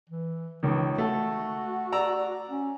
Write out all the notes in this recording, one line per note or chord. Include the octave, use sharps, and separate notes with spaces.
E3
C#2 D#3 E3
A3 F#4
D5 A#5 E6
C#4